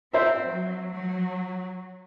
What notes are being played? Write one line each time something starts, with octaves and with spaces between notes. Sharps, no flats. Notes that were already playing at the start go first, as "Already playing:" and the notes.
C4 C5 E5
F#3
F#3